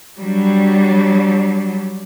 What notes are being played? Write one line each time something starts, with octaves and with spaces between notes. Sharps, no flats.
F#3 G3 D4